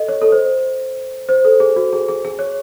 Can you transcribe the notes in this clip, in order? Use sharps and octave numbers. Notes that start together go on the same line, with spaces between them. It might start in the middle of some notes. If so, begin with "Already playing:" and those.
Already playing: A4 D#5
C#5
A4
C5
C5
A4
G#4
F#4
G#4
G#4
G#4
C#5